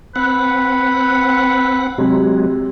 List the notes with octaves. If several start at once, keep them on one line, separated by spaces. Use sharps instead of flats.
C4 B4 F#5
C3 F#3 G#3